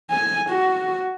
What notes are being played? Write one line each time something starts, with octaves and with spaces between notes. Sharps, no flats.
G#5
F#4